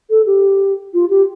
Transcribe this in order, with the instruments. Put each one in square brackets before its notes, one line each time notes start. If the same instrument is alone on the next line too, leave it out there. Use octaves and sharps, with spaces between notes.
[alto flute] A4
G4
F4
G4